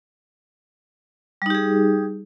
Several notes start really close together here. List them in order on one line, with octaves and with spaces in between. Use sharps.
G3 D#4 G4 G#4